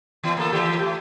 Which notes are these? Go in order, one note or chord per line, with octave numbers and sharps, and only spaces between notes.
E3 B3
A#3 A4
E3 G4
A3